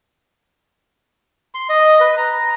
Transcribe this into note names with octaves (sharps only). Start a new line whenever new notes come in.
C6
D#5
B4
A#5